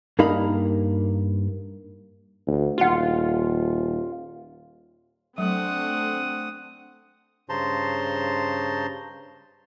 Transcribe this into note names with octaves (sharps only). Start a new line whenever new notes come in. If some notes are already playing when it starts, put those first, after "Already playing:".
G2 A#3 D#4 A#4 F5 B5
D2
D#1 F4 F#4 F#5
F#3 A3 C4 D4 F#5 D#6
G2 C#3 C5 A5 A#5 C6